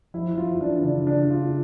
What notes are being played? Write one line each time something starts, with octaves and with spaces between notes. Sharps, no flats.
F3 E4
F3 F4
E3 D4
C#3 D4
D4
F4